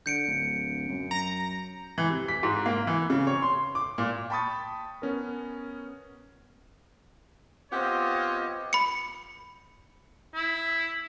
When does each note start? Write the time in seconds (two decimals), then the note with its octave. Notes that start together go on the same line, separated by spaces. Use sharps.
0.06 D3 G6 C#7 D7
0.28 D1
0.88 F#2
1.11 A#5
1.98 E3
2.09 C3
2.28 B6
2.43 G#2
2.66 A#3
2.87 E3
3.10 C#3
3.27 C#5
3.42 C6
3.75 D6
3.98 A#2
4.30 G5 A5 B5 C#6 D#6 A6
5.02 B3 C#4 A#4
7.72 B3 C4 F4 G4 C#5 D#5
8.73 B5 C#7
10.35 E4